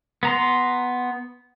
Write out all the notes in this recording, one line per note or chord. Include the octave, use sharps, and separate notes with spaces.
B3 A#5 C6